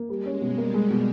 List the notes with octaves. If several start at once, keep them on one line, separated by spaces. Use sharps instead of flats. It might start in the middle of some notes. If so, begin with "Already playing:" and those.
Already playing: A#3
G3 G#3
C#4
B2 G3
A#3
G#3
B2